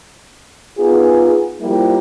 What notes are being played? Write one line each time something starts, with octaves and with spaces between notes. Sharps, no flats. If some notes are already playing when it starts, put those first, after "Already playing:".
B3 D#4 F4 G#4
F3 G3 A#3 E4 G4